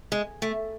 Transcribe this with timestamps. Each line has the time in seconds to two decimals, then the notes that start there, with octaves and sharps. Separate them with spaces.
0.12 G#3
0.42 A3